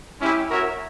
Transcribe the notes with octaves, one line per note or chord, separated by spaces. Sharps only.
G#3 C#4 E4 G4
C#4 F#4 A#4 C#5 E5